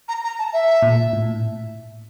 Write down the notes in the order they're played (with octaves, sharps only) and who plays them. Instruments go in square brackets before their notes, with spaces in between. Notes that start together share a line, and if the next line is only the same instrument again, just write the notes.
[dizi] A#5
A#5
A5
E5
[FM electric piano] A#2
A2